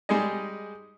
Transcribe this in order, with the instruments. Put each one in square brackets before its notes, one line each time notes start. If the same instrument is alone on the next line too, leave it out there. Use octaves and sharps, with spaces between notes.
[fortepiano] G3 G#3 D#4 G#4 D#5